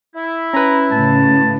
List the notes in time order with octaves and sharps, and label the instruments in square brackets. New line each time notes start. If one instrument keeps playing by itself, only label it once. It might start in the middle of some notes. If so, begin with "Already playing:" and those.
[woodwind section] E4
[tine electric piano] C#4 B4 [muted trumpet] A#5
[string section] A2 C#3 [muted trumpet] A5